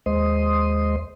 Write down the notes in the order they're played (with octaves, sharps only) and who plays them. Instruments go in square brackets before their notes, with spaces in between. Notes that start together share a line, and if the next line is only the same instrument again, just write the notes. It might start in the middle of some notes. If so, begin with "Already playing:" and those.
[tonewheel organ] D#2 G#3 C5 D#5 C6 D#6